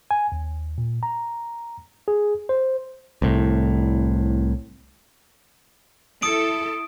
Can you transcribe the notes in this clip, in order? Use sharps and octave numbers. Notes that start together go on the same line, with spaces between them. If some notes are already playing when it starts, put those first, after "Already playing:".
G#5
D#2
A#2
A#5
G#4
C5
C2 A2
E4 A4 D#6 D7